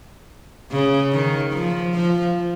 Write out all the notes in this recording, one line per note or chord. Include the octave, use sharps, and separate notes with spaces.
C#3
D#3
F3
F3